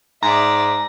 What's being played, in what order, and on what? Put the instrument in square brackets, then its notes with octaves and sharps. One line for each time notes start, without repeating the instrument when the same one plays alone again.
[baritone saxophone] G#2 [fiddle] D5 E5 [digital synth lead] A#5